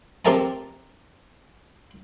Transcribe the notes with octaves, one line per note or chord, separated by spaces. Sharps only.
C4 G4 A#4 E5 A5 A#5